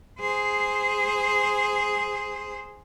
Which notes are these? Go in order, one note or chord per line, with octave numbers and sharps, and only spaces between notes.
G#4 C5